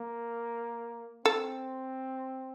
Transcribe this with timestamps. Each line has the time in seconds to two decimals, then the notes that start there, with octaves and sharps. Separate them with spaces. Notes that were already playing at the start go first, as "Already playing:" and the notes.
Already playing: A#3
1.25 C4 A4